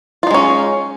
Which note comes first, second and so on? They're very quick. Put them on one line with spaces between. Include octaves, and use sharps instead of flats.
F4 D#4 G#3 C#4